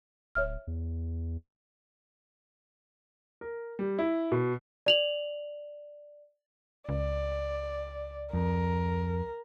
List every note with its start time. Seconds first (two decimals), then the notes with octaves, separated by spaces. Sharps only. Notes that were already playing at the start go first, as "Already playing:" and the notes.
0.35 D1 C#5 E5 F6
0.67 E2
3.41 A#4
3.79 G3
3.99 E4
4.32 B2
4.86 D5 F7 F#7
6.89 C#2 D5
8.33 F2 A#4